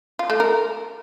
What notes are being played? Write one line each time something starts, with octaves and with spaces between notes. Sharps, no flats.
F4
A3
A#4